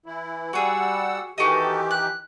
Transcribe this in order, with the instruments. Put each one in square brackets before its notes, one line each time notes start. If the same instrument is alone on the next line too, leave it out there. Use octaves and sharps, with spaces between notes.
[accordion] E3 E4
[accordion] G3 F#5 E6 [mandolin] F#4 G#4
[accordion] D#3 E3 G4 [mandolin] F#4 A4 D#5
[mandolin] F#6